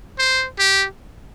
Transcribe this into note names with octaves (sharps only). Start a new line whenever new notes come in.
C5
G4